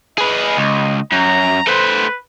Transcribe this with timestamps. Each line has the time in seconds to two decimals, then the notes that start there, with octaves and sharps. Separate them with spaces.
0.18 G#4 B4 D#5
0.57 C#2
1.12 F#2 A#5
1.67 A3 B4 C5